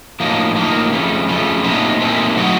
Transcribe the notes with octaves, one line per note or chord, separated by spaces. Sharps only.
A2 F3 A#3 D#4
A2 F3 A#3 D#4
F2 C#3 F3 A3
F2 C#3 F3 A3
A#2 A3 C4 D#4
A#2 A3 C4 D#4
A2 F#3 C4 D#4 F#4